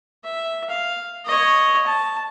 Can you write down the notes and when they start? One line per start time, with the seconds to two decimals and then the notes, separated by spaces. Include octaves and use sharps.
0.24 E5
0.69 F5
1.26 C#5 D#5
1.86 A5